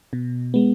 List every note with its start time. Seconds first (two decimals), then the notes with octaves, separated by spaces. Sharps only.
0.13 B2
0.54 G#3 B3